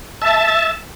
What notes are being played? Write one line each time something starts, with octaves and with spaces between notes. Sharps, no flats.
E5 A5